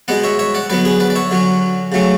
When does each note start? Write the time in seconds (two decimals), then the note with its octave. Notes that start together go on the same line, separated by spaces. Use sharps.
0.08 B2 G#3 B3 D5 F#5
0.24 C#5 E5
0.39 C#5 E5
0.55 D5 F#5
0.70 D3 F#3 B3 B4 D5
0.85 G#4 B4
1.00 B4 D5
1.10 D5
1.15 C#5 E5
1.31 D3 F#3 C#4
1.92 C#3 F#3 A3 C#4